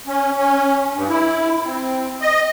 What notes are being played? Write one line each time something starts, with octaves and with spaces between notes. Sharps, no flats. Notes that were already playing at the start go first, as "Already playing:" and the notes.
C#4
C#4
G2
E4
C4
D#5